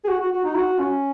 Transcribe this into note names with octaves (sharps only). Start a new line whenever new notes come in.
G#4
F#4
F#4
F#4
D#4
F#4
C#4